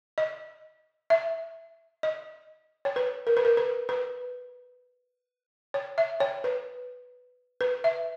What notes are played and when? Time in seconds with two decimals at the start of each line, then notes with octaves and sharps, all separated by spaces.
0.18 D#5
1.10 E5
2.03 D#5
2.85 C#5
2.96 B4
3.27 A#4
3.37 B4
3.45 A#4
3.57 B4
3.89 B4
5.74 C#5
5.98 E5
6.20 C#5
6.44 B4
7.61 B4
7.84 E5